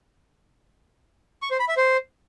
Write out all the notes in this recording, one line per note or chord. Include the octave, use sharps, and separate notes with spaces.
C#6
C5
B5
E5
C5